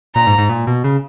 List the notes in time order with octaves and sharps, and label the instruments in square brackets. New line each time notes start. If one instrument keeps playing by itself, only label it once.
[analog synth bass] A#2 [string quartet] A#5
[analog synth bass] G#2
G#2
A#2
B2
C#3